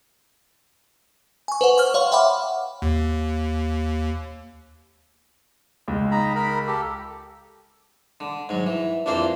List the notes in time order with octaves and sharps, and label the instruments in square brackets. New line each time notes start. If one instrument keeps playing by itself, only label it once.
[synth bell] G#5 C#6
B4 C5 F#5
C#6 F6
C#5 F5 C6
E5 F#5 G5 B5 D6
[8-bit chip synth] D#2
[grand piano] C#2 G#3
[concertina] D#4 A#5 B5
A#4 B5
G4 A4
[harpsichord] D3
G#2 F#3
E3
A#1 F2 E3 A#3 D4 C5